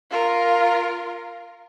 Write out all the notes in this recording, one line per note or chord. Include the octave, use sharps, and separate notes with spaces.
F4 A#4